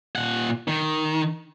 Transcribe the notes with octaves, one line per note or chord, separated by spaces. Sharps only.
A#2 F#5
D#3